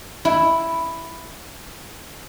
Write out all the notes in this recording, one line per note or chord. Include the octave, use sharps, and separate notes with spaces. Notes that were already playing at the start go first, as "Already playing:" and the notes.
E4